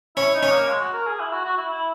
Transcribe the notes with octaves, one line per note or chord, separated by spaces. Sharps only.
C#4 E4
D#4
C#4
A#3
G#3
F#4
A#4
G#4
E4
F#4
F#4
E4
E4